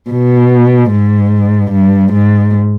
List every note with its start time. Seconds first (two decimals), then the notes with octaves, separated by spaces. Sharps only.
0.11 B2
0.91 G#2
1.71 G2
2.13 G#2